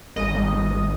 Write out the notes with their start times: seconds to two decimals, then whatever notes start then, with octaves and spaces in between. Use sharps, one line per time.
0.16 G#1 D#5
0.35 G#1
0.53 G#1
0.70 G#1